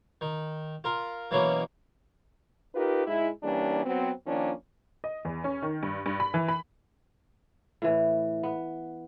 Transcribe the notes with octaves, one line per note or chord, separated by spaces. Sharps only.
D#3
F4 A#4
B2 E3 F#3 A#3 C#4
D#4 F4 G4 A#4 B4
G#2 G#3 E4
E3 G3 A#3 C#4 D4
F#3 B3 C4
D#3 F3 A#3 C#4 D4
D#5
E2
C#4
D#3
G2
G2
B5
E3
B5
A2 E3
B3